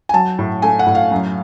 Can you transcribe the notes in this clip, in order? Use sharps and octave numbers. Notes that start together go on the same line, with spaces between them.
G#5
F#3 A5
A2
A3 G#5
F#5
A2
F5
F#2